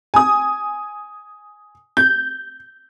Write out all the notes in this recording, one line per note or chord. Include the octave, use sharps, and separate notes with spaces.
G#5 D#6
G6